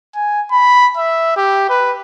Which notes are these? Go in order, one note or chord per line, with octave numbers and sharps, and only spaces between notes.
G#5
B5
E5
G4
B4